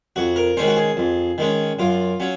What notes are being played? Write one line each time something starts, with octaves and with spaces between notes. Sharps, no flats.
F2 F#4
A#4
D#3 G#3 C#4 C5
F#4
G#4
F2
D#3 G#3 C#4
F#2 F4
F#3 C#4